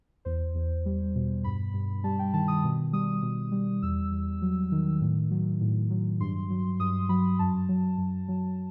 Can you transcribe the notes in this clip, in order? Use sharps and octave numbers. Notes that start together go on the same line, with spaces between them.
E2 C5
E2
G3
B2
G2 B5
G2
G3 A5
G5
D#3 A5
D#6
B2
G3 D#6
B2
G3
E2 E6
E2
F#3
D#3
A2
F#3
A2
F#3
G2 C6
F#3
G2 D#6
F#3 B5
F#2 A5
F#3
F#2
F#3